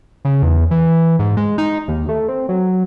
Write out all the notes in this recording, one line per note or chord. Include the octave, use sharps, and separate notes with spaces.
C#3
E2
E3
G#2
G#3
D#4
D#2
A3
C4
F#3